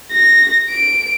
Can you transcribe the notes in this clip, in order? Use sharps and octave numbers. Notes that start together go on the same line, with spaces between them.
A#6
D7